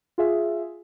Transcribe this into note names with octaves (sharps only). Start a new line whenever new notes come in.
F4 G#4 E5